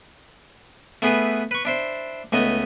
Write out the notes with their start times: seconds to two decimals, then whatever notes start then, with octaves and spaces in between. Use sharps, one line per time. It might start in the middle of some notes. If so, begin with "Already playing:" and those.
1.02 A3 B3 E4 G#4 B4
1.51 B4 C#6
1.65 D4 E4 C5
2.32 C#2 A3 B3 D#5